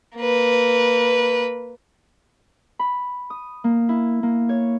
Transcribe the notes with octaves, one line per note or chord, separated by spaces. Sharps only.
A#3 B4
B5
D#6
A#3
E4
A#3
C#5